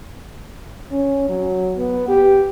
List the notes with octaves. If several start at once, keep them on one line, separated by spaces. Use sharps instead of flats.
C#4
F#3
B3
G4